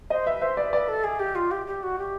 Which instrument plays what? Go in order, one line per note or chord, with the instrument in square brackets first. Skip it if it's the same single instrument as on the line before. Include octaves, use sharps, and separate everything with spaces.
[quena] C5 [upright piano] D#5
[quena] B4 [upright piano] E5
[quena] C5 [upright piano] E5
[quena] B4 [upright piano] D5
[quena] B4 [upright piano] D5
[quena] A4
G#4
G4
F4
G4
G4
F#4
G4